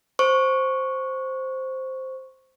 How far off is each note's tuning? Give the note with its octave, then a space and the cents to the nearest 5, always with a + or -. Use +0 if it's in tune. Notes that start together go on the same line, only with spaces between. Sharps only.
C5 +0 C#6 +0